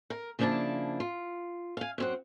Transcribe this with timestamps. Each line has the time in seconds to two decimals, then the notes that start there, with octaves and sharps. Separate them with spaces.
0.10 A#4
0.39 C#3 F3 A#3 D4 E4 A5
1.00 F4
1.77 F5 G#5
1.98 F#2 C4 F#5